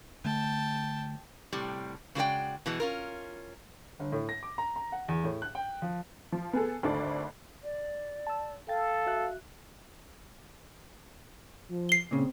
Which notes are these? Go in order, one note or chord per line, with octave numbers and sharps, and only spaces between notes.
D3 A3 G5 A5
A2 C3 G3
C#3 G#3 F#4 A4 D5 G5
B2 E3 G#3
C#4 F4 A#4
G1
A2
A#6
D6
A#5
A#5
F#5
E2
A2
F#6
G5
F3
F3
B3 G#4 A4
G#1 D2 D3 D5
D5
A5 E6
A4 F5 G5 A6
F#4 E5 F#6
F3
C7 G7
A#2 C#3 C4